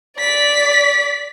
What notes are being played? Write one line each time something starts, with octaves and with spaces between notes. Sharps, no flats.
D5 B6